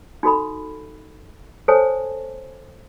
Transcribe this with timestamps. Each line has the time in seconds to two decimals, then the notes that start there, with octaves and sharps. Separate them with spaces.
0.23 D#4 F#4 A4 B5
1.68 A4 C5 C#5 G#5 A5